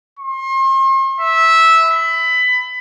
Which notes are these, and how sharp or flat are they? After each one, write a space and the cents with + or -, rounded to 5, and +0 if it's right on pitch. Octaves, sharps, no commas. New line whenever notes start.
C6 +40
E5 -10
B5 +20